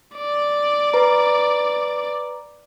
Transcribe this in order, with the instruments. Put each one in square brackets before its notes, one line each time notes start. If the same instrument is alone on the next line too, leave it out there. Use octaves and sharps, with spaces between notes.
[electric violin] D5
[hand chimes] B4 A#5